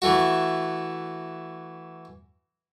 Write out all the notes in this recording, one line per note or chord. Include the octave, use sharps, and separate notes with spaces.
E3 A3 F#4